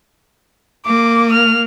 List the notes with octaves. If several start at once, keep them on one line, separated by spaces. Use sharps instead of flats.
A#3 D6
F6